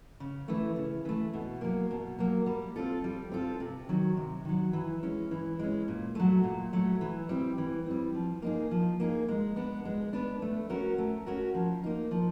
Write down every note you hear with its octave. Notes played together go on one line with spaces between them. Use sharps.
C#3
E3 A3
C#3
E3 A3
B2
F#3 A#3
B2
F#3 A#3
G3
C4 F4 A4
G3
C4 F4 A4
C3
D#3 F#3
C3
D#3 F#3
E3
G#3 C#4
E3
G#3 C#4
A#2
F#3 A3
A#2
F#3 A3
E3
G3 C4
E3
G3 C4
F3
A#3 D#4 G#4
F3
A#3 D#4 G#4
G#3
B3 D4
G#3
B3 D4
A3
C#4 F#4 A#4
A3
C#4 F#4 A#4
F3
A#3 D#4
F3